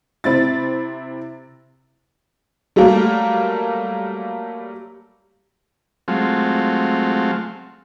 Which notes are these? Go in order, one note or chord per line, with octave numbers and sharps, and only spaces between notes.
C3 C4 E4 A6
F#3 G3 A3 A#3 A#4
F#3 G#3 A3 C4 F4